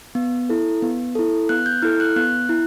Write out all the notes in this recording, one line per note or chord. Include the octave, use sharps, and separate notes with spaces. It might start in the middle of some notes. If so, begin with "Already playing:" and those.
B3
E4 A4
B3
E4 A4
B3 F#6
G6
E4 A4 F6
F#6
B3 F#6
E4